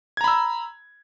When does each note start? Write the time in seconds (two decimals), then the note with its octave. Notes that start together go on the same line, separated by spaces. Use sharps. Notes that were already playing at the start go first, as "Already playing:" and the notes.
0.17 G#6
0.21 A#5
0.24 B5
0.28 E6